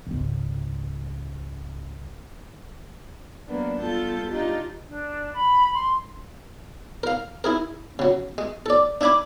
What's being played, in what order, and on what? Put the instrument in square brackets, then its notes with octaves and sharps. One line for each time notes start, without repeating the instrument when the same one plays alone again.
[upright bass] G#1 C#2
[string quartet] F#3 A#3 B3 D4
G2 B3 F4 A4 A5 G6
D4 D#4 F4 G4
[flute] D4
B5
C6
[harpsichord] A#4 F5
E4 G#4 A#4
C#3 F#3
G#3
A4 D5
D4 E5 G#5 B5 D6